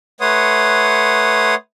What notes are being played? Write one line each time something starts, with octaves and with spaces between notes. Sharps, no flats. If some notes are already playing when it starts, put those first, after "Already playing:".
A3 B4 C#5 F#5 C6 D#6